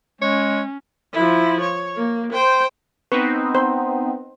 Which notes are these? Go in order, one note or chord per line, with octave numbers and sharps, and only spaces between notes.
G#3 C#4 C#5
F3 E4
C#5
A#3
C5 G5
B3 C4 D#4 B4 C#6
C5